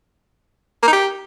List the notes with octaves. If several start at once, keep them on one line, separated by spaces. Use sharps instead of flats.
A#3
D#4
G4